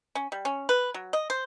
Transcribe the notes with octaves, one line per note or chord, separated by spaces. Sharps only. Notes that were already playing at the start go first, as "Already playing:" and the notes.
C#4
G3
C#4
B4
F#3
D#5
C5